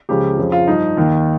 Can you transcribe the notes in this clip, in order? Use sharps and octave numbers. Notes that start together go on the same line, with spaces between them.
C#2 C#3 F3 G4
F2 C#3 F3
F4
G2 F3 D#4
D#2 D#3